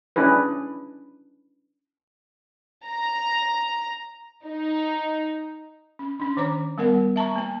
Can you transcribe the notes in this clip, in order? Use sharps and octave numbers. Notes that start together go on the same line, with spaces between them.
C#4 D4 E4 G#4 B4
A#5
D#4
C#4
C#4 D4
D#3 C5 C#5 A#5 D6
G3 B3 A#4 F#5
E5 A5 A#5 C#6
A#3 A5